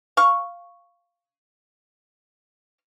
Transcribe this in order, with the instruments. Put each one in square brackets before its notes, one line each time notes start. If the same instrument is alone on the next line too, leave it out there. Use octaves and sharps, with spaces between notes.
[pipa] F5 C#6